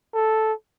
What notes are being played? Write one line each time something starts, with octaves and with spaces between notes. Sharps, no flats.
A4